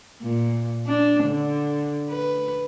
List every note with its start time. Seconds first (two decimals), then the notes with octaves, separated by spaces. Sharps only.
0.22 A#2
0.87 D4
1.24 D3
2.10 B4